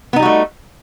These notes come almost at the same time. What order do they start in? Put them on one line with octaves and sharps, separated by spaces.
B3 D#4 G3 F#4 A3